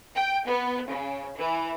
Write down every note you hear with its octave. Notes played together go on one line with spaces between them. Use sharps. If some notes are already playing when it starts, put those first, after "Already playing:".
G5
B3
C#3
E3